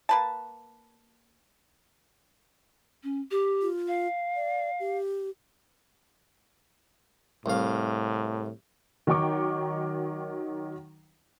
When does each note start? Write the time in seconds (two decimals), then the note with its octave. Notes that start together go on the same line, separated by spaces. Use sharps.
0.09 A#3 B4 A5
3.04 C#4
3.31 G4
3.62 F4
3.88 F5
4.36 D5
4.80 G4
7.46 C2 A2 F5
9.07 D#3 F#3 D#4 G5 C#6 D6